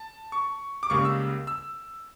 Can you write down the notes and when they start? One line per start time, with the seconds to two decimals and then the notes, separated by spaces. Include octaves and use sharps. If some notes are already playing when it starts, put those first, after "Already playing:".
Already playing: A5
0.32 C#6
0.83 D6
0.90 C#2 C#3 G3 A#3 C#6
1.05 E6
1.47 E6